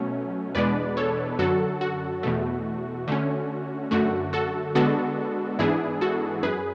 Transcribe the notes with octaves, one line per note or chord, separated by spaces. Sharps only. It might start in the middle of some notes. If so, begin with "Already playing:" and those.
Already playing: B2 F#3 A3 C#4
E2 B2 G#3 B3 D4 B4 D5
A4 C#5
F#2 D3 F#3 F#4 A4
F#4
E2 B2 A3
D3 A3 C#4
F#2 D3 A3 F#4
F#4 A4
D3 G#3 B3 D4 F#4 A4
G#2 E3 B3 D4 E4 G#4
F#4 A4
F#2 G#4 B4